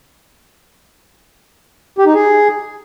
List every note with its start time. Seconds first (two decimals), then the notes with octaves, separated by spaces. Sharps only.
1.98 G4
2.06 D#4
2.14 G#4